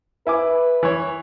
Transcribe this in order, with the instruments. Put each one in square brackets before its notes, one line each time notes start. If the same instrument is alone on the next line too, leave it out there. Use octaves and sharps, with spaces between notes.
[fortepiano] E4 G#5 D6 [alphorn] B4
[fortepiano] E3 C#5